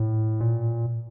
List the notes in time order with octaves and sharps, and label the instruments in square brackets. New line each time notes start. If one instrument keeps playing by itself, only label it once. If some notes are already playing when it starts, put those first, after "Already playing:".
Already playing: [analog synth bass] A2
A#2